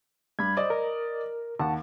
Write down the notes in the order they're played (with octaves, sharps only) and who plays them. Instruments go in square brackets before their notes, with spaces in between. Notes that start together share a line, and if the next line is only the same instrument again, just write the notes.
[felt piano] G2 [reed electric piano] B5 G#6
[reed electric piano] C5 [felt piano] D5 D#5
[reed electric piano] A#4
[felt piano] D#2 [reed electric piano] F#5 A5